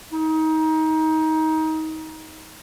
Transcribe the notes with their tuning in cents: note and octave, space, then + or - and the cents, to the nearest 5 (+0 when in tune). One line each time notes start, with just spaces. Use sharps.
D#4 +20